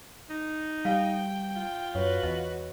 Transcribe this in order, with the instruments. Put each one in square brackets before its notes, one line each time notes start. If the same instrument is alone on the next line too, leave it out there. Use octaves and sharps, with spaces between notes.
[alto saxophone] D#4
[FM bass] G3 [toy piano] F5 [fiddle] G5
[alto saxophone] F4
[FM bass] F#2 [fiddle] F#4 B4 [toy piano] C#5
[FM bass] E2 [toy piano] D#5